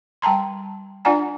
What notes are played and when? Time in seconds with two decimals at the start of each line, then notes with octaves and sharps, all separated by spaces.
0.22 G3 G5 A5 A#5 C6
1.05 D4 F4 D5 F#5 G#5 A#5